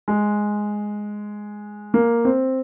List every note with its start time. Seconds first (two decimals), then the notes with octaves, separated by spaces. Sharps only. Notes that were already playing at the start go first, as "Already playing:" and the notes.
0.08 G#3
1.94 A#3
2.25 C4